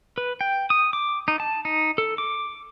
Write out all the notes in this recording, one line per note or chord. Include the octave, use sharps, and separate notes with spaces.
B4
G5
D#6
D6
D#4
A5
D#4
A4
D6